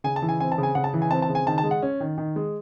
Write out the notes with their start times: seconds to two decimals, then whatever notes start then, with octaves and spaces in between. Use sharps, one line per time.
0.04 C#3 G#5
0.16 A5
0.22 E3
0.29 G#5
0.40 C4 G#5
0.52 A5
0.58 C#3
0.63 G#5
0.75 C#3 F#5
0.84 A5
0.94 E3
1.02 G#5
1.11 C4 A5
1.22 A5
1.29 C#3
1.35 G#5
1.46 D#3 A5
1.58 A5
1.64 G#3
1.71 F#5
1.82 C#4
2.00 D#3
2.18 D#3
2.36 G#3